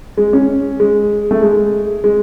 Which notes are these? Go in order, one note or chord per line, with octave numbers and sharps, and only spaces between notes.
G#3
C#4
G#3
A3
G#3
G#3